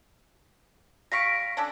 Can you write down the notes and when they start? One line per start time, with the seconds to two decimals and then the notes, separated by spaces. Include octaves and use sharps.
1.12 G3 F5 C#6 A#6 B6 D7
1.57 C#4 D4 A4